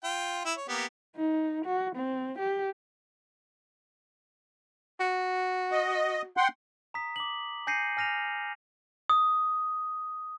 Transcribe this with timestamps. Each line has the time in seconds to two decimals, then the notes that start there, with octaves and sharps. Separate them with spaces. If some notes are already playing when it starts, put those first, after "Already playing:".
0.04 F4 G5
0.45 E4
0.57 C#5
0.68 A#3 B3 G4
1.16 D#4
1.66 F#4
1.96 C4
2.39 G4
5.00 F#4
5.72 D#5
6.37 F#5 G5 C6
6.94 A#5 D#6 B6
7.16 D6 F#7
7.67 G#5 G6 A#6 C7 C#7 D#7
7.97 G#5 F6 A#6 D#7 F7
9.10 D#6